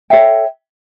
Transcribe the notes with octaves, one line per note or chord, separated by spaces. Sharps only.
A4 C#5 E5 G5